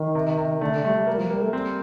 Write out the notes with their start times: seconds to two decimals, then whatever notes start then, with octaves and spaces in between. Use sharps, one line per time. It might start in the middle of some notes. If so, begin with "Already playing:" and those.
Already playing: D#3
0.15 C3
0.38 C3
0.61 D3 A3
0.73 D3
0.85 G3 A3
0.96 G3
1.07 G3 A#3
1.18 F3
1.30 G3 A#3
1.42 A3
1.53 G3 C4